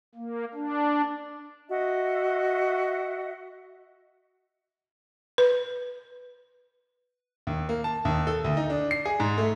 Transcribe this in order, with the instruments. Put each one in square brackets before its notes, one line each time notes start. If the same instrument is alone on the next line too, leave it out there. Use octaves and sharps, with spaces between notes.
[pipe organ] A#3
D4
[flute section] F#4 D#5 E5
[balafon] B4
[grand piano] D#2
A#3
A5
D#2
A4
D2
D#4
D4
C7
G#4
G#2
A3